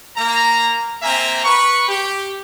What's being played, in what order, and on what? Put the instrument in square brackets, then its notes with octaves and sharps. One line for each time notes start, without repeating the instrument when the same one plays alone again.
[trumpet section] A#3 A#5
A#3 C4 E5 G#5 A#5
B4 C#6
G4